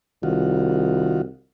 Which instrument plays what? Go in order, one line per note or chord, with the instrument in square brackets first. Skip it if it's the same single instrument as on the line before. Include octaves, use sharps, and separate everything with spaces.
[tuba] C2 [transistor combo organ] D#3 F4 F#4